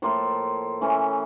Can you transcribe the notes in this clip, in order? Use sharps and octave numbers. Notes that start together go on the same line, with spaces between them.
A2 F3 A#3 C6
E3 A3 C#4